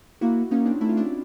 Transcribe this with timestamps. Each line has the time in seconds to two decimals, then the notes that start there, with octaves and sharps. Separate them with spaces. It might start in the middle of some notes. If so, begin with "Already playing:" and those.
0.21 A#3 E4 F#4
0.51 A#3 C#4 D#4
0.66 C4 D4
0.81 A3 E4
0.89 F4
0.97 D4 E4